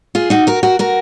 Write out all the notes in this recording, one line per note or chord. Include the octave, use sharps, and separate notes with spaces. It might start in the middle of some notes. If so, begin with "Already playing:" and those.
F4 G#4
D#4 F#4
F#4 A#4
F#4 A#4
F#4 A#4